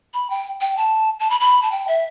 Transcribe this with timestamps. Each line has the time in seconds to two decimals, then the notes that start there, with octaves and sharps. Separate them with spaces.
0.14 B5
0.30 G5
0.61 G5
0.77 A5
1.20 A5
1.30 B5
1.40 B5
1.62 A5
1.72 G5
1.88 E5